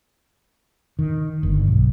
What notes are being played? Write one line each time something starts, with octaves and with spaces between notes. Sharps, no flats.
D#3
G1
B1